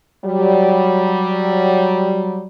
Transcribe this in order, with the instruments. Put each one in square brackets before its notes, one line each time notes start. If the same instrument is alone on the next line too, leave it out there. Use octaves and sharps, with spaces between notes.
[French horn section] F#3 G3